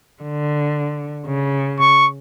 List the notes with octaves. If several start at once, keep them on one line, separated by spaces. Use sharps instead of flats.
D3
C#3
C#6